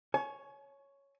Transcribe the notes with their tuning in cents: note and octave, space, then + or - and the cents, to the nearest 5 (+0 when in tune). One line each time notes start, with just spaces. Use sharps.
C#5 +0 G#5 +40